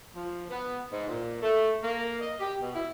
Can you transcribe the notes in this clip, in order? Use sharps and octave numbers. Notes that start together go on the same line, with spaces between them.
F3
B3
G#2
A#2
A3
A#3
D#5
G4
B2
E4